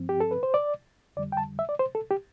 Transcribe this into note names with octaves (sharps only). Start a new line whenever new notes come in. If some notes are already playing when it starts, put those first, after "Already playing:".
Already playing: G2 F3 C4
G4
A4
B4
C5
D5
F2 D3 G3 D5
G5
A5
E5
D5
C5
A4
G4